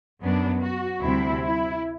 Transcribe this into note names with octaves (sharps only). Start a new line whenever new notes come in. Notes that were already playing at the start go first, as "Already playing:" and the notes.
F#2 F#3 B3 D4
F#4
D2 C3 G3 C4 E4
E4